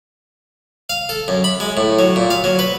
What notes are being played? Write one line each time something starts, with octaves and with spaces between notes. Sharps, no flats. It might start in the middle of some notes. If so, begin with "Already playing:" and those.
F5
A4
F#2
B5
G#3
A2
F#3
A#2
F5
F#3
B4